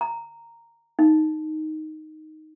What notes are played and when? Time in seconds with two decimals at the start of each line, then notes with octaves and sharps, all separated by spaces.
0.01 A#5
0.99 D#4